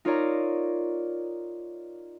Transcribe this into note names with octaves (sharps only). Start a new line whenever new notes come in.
D#4 F4 A#4 C#5 D5 A#5